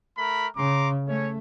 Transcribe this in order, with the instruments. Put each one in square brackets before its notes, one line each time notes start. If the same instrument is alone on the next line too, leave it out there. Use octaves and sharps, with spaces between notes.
[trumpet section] A3 A#4 B5
[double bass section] C#3 [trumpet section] A#5 C6 D6
[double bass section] A3 [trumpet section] C#4 C#5